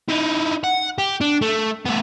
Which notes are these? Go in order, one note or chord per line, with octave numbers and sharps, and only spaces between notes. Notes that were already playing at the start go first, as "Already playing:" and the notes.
D#4 E4
F#5
G4
D4
A3
A3 B3